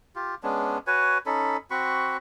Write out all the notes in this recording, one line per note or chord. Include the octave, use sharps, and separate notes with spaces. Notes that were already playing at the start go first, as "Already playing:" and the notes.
F4 G4
G#3 B3 C#4 D4
F#4 B4 C#5 G#5
C#4 D#4 A4 B5
C4 F#4 B5 C#6